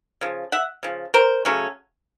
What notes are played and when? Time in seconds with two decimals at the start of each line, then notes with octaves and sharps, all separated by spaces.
0.21 C#3 F3
0.52 E5 F#5
0.83 C#3 F3
1.14 A#4 C5
1.45 C#3 F#3 A3 C#4